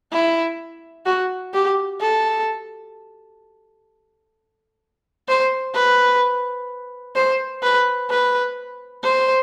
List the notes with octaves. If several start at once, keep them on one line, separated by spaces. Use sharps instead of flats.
E4
F#4
G4
A4
C5
B4
C5
B4
B4
C5